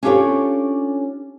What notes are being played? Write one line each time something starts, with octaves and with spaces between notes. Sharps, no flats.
C#4 D4 F4 G4 A4 C#5